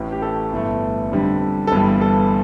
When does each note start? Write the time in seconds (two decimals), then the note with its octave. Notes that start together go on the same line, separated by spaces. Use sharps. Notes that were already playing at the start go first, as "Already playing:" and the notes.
Already playing: A1 A2 E3
0.12 G4
0.22 A4
0.52 G1 G2 E3 A3
1.12 F2 D3 G3
1.67 A4
1.72 G1 G2 E3 G3 B4
2.01 A4